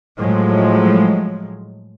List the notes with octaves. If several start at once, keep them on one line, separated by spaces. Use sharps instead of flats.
A2 F3 F#3 G#3